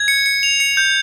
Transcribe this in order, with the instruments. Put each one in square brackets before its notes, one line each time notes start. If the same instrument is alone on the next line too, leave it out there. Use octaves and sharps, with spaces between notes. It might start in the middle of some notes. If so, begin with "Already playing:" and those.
Already playing: [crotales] G#6
C#7
C#7
F7
C#7
G6